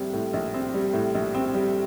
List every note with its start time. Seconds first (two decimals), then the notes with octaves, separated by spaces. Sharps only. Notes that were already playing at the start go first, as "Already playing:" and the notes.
Already playing: A#1 A2 G3 C4
0.13 A2
0.33 A#1
0.54 C4
0.74 G3
0.94 A2
1.15 A#1
1.34 C4
1.54 G3